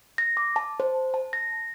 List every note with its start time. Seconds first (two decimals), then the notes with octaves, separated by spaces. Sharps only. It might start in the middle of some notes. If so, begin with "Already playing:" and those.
0.18 A#6
0.37 D6
0.56 A5
0.80 C5
1.14 A5
1.33 A#6